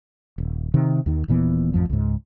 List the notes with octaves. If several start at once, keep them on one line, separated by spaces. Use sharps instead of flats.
D#1
C3 D#3
D#2 D#3
D#1 A#2 E3 B3
A1 F2 F3
C#2 G#2